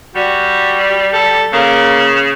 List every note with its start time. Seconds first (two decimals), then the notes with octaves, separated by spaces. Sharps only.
0.15 G3 F#4
1.13 A4
1.53 C#3 A#3